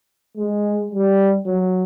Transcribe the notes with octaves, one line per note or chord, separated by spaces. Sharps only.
G#3
G3
F#3